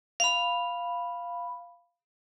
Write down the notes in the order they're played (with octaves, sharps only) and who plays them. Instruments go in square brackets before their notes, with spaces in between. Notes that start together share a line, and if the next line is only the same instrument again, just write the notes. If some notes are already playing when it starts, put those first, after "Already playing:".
[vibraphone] F5 B5